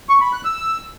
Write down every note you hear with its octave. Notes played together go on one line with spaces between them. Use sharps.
C#6
B5
F#6
E6